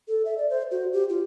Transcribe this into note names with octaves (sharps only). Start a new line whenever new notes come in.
A4
E5
D5
C5
F#4
G4
F4